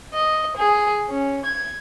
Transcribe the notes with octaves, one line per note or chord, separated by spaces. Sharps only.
D#5
G#4
C#4
G#6